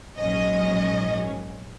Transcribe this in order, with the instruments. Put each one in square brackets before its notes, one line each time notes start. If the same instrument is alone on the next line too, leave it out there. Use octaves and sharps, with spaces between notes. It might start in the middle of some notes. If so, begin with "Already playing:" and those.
[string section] A#1 G#2 F#3 C#4 D#5